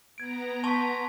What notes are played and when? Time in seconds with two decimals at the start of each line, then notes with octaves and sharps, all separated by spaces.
0.18 B3 A#5 G#6 D7
0.64 A5 C6 C#6 B6